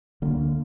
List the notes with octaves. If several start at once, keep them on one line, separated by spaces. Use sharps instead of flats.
D2 D3 G3 A#3